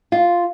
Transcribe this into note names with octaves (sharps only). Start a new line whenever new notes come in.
F4